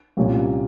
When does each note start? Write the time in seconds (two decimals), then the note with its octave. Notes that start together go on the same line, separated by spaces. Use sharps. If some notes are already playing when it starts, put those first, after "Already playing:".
0.17 C2 A#2 G3 A#3 C#4